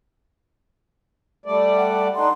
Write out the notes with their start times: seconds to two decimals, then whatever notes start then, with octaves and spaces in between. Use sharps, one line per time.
1.46 G3 A3 D5
1.78 F#5
2.15 D4 D#4 C6